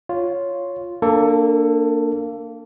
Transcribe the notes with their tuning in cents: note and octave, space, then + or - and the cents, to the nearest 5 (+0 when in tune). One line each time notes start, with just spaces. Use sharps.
F4 +0 C#5 +0
A#3 -15 D4 +0 A4 +15